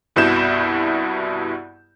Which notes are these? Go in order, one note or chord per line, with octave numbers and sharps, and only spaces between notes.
C2 G2 B2 E4 G6 E7